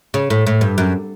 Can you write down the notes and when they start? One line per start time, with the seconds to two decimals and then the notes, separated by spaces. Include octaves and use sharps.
0.14 C#3
0.30 A2
0.47 A2
0.61 G2
0.78 F#2